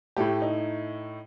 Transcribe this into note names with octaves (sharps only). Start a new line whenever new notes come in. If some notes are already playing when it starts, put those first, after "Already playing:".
A2 A3 G4
D#4